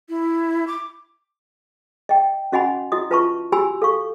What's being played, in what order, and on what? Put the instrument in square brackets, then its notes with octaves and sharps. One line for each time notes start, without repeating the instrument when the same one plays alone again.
[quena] E4
D6
[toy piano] D#5 G5
C#4 F#4 D#5 F#5 G#5 B5
E4 F#4 D#5 D#6
F4 B4 E5 A5 B5 C#6
F#4 G4 G#5 B5 E6
A4 F5 C#6